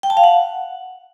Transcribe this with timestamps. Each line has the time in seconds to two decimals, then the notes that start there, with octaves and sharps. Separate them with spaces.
0.03 G5
0.10 A5
0.17 F5
0.24 F#5